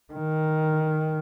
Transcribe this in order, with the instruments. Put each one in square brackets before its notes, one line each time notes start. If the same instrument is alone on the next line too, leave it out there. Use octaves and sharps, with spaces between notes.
[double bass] D#3